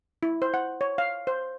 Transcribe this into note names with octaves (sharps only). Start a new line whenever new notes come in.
E4
C5
F#5
C#5
F5
C5